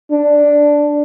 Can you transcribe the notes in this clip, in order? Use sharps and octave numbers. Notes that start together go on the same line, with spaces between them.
D4